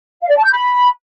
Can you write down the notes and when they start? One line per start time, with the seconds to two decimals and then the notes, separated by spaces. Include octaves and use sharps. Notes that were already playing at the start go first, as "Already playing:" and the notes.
0.21 F5
0.29 D5
0.37 A5
0.45 G6
0.52 B5